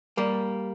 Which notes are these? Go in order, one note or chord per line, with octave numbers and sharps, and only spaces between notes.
G3 A#3